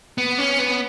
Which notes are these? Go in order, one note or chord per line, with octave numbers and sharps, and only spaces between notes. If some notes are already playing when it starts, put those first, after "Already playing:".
B3
C#4
B3